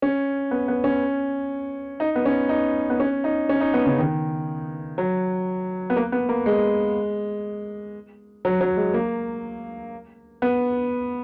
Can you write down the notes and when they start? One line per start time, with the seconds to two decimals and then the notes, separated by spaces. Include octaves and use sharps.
0.02 C#4
0.51 B3
0.68 B3
0.84 C#4
2.00 D#4
2.16 B3
2.25 C#4
2.49 D#4
2.90 B3
3.00 C#4
3.24 D#4
3.49 C#4
3.61 D#4
3.74 B3
3.86 C#3
3.99 D#3
4.98 F#3
5.90 B3
5.96 A#3
6.12 B3
6.29 A#3
6.46 G#3
8.45 F#3
8.61 F#3
8.77 G#3
8.94 A#3
10.42 B3